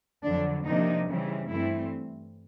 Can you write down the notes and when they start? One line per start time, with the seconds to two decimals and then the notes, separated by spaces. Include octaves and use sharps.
0.24 F2 D3 F#3 D4
0.66 C3 F3 A#3 D4 D#4
1.07 C#3 E3 G3 C4
1.48 G2 E3 A3 C4 E4